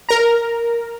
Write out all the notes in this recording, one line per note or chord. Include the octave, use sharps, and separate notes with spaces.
A#4 A#5